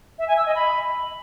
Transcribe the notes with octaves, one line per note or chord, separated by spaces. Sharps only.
E5
G#5
E6
D#5
B5